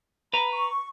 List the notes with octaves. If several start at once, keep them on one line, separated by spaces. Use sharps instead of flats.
B4 A#5 B5
C#6